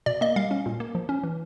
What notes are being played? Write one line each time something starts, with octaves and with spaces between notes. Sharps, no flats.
B2 D5
A#3 D#5
G3 F5
C#4
A#2
A#3
F3
C#4
E3